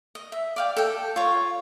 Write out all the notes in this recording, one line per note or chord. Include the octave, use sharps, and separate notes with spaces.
D#5
E5
D5 F5 G5
A4 G5
F4 C#5